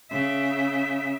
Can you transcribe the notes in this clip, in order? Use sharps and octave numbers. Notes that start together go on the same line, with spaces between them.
C#3 E5